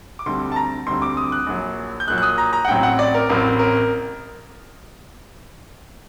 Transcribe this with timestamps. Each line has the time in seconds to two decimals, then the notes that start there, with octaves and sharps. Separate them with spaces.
0.19 D6
0.26 D2 D3 G3 C4 C6
0.52 A5
0.56 A#5
0.87 D2 D3 G3 C4 C6
1.02 D6
1.17 D#6
1.32 F#6
1.47 A#1 A#2 F#3
2.00 G6
2.08 A#1 A#2 F#3 F#6
2.18 F#6
2.22 D#6
2.38 A#5
2.53 A#5
2.65 F#5
2.68 A1 A2 F#3 C4 G5
2.83 F#5
2.99 D5
3.15 A#4
3.29 A1 A2 F#3 C4 A#4
3.59 A#4